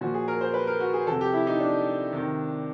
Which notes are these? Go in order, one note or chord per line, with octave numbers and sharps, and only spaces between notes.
A#2 F3 F#4
G#4
A#4
C5
B4
A#4
F#4
G#4
C3 F3 A4
G4
E4
D#4
D4
C3 D#3